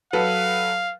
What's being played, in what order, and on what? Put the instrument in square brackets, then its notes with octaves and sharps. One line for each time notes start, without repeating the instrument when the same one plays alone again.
[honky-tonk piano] F#3 A4 B4 [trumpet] F5